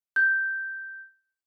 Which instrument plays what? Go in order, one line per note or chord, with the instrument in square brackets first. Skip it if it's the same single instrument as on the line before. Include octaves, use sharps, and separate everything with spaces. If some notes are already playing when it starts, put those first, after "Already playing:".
[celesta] G6